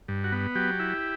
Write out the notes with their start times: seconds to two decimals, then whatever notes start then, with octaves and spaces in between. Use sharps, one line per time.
0.08 G2
0.24 F#4
0.32 B3
0.55 F#3 G4
0.79 E4